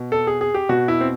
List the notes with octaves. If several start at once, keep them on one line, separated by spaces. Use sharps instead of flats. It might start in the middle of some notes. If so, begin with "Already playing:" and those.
Already playing: B2
A4
G#4
G#4
G4
B2 F#4
E4
C4